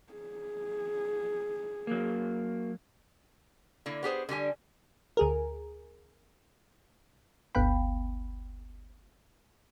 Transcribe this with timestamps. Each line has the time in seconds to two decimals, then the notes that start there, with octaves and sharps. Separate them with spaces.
0.13 G#4
1.87 F#3 A#3
3.86 D3 A#3 E4
4.03 B3 G4 G#4 C5
4.29 D3 G3 G4 G#5
5.17 D2 G#4 A#4
7.55 G1 D2 B3 F5 G5 B5